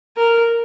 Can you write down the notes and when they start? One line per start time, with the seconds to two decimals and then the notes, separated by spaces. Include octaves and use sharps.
0.16 A#4